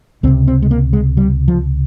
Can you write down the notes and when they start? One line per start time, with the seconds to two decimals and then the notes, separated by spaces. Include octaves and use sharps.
0.23 C#2 C4
0.27 C3
0.48 C4
0.62 G#3
0.71 A#3
0.93 G#3
1.17 G3
1.48 F3